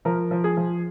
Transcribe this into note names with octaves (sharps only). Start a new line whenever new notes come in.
F3 A#4
F3
G#4
F3